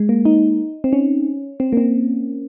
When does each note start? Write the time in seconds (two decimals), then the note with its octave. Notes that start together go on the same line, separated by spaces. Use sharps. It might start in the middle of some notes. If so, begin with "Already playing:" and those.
Already playing: G#3
0.09 A#3
0.25 D#4
0.84 C4
0.93 C#4
1.60 C4
1.73 A#3
1.77 C4